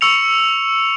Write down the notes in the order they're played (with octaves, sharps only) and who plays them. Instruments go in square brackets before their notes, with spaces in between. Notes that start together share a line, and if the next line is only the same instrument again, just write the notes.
[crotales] C#6 E6 C#7 F7